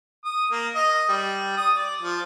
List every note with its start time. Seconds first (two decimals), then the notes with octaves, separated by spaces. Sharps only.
0.25 D#6
0.52 A#3
0.75 D#5
1.09 G3
1.57 D#6
1.76 D5
2.02 F3